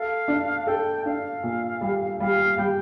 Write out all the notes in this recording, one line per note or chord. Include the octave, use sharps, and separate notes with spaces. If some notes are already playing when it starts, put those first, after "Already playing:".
Already playing: A4 F5
D4
A4 G5
D4 F5
A#2
G3
G3 F5
G3 G5